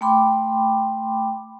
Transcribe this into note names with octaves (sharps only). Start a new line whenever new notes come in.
A3 G5 B5 C6 D6